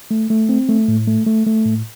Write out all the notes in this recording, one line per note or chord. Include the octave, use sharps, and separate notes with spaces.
A3
A3
C4
A3
A2
A3
A3
A3
A2